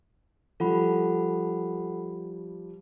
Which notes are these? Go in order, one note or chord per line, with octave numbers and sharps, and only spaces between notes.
F3 G3 A4 F#5 B5